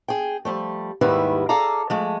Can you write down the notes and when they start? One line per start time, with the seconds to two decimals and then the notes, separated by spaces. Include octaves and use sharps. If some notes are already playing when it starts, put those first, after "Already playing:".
0.08 G#4 G5
0.45 F3 G3 A3
1.01 D#2 G#2 D#3 G3 E4 B4
1.49 G#4 A4 D5 F5 A#5
1.90 F3 G#3 A3